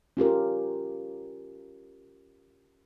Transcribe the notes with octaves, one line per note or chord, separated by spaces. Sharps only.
C#4 F4 G4 A#4